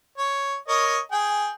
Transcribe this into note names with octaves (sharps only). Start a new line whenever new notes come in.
C#5
A#4 C#5 D#5
G#4 G5